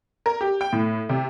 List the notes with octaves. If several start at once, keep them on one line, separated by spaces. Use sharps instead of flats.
A#4
G4
G5
A2
C3